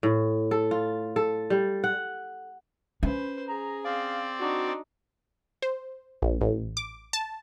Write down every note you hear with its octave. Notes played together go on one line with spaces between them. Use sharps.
A2
A4
F4
A4
G3
F#5
C#4 B4 C5
G#4 A#5
C4 D5 F5
D4 D#4 F#4
C5
A#1
A1
D6
A5